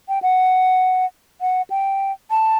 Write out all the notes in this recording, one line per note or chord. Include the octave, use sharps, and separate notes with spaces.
G5
F#5
F#5
G5
A5